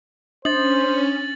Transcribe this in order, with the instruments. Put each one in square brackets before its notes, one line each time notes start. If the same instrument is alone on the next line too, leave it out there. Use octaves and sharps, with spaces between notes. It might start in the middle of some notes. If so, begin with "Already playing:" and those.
[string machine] C#4 [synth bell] D4 [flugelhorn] C5 [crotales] A6 F#7